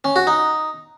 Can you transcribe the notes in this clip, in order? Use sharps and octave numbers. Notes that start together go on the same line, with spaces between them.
C#4
F#4
D#4